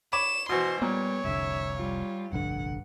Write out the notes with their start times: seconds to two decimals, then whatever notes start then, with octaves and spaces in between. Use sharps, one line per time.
0.13 C#5 B5 D6 E7
0.49 B2 E3 F#4 C5 C6
0.82 A#2 G3 B3 C#5
1.25 F1 C2 D3 E5
1.75 G3 F4
2.33 F1 A#1 G2 D3 F#5